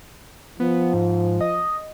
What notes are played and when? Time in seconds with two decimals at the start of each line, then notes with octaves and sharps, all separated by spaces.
0.60 F3 B3
0.93 G#2
1.41 D#5